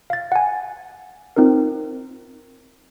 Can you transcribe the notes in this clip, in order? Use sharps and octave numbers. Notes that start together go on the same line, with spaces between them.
F5 A6
F#5 G#5
C4 D#4 F4 A#4